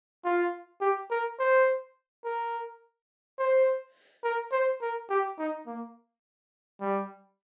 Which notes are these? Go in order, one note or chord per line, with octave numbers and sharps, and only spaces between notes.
F4
G4
A#4
C5
A#4
C5
A#4
C5
A#4
G4
D#4
A#3
G3